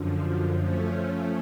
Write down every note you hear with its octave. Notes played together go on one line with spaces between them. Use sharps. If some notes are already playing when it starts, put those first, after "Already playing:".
Already playing: F#2 D3 F3
F3 A3 C#4